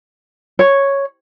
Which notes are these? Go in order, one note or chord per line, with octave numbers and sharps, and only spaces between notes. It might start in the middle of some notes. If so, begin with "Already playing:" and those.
C#5